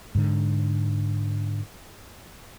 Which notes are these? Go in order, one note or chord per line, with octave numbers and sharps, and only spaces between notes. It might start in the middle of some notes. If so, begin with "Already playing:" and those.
G#2 D3